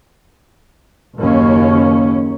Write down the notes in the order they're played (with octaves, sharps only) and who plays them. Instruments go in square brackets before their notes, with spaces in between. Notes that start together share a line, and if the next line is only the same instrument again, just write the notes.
[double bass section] F#1 D#2 A#3 C#4